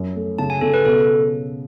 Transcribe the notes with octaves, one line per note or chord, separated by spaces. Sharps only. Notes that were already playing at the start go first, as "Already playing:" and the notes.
Already playing: F#2
A3
C#3 A5
G#5
C#3 A4
B4
B2 A4